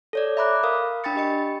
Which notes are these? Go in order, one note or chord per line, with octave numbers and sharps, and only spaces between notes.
A4 C#5 D5
E5 A#5 B5 D6 F#6
A#4 F5 D#6
D4 G5 B5 A6 C#7
G4 D#5 C#7